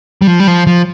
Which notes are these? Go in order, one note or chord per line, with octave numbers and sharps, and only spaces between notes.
G3
F3
G3
F3
F3